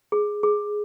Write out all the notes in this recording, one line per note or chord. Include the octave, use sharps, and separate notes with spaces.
G#4
G#4